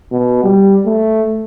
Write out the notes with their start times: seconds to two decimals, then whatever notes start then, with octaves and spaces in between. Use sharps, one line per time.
0.12 B2
0.43 G3
0.86 A3